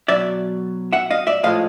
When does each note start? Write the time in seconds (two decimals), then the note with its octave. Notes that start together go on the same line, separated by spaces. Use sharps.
0.08 B2 F#3 D5 E5
0.93 E5 F#5
1.11 D#5 F5
1.27 D5 E5
1.43 A2 F3 G#3 D#5 F5